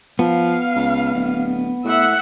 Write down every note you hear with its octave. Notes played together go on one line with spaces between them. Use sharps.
F3 B3 F5
C#2
D1
A2 E5 F#5